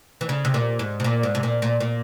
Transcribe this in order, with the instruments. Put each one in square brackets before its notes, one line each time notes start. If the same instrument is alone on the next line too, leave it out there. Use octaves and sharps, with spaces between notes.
[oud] E3
C#3
C3
A#2
G#2
C3
A#2
G#2
C3
A#2
A#2
A#2